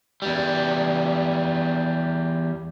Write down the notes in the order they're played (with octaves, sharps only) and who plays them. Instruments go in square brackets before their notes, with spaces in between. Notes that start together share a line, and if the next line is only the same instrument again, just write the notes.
[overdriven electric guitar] E2 G3